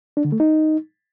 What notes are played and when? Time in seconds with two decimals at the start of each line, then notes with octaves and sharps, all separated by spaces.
0.17 D4
0.25 D3
0.32 A3
0.40 D#4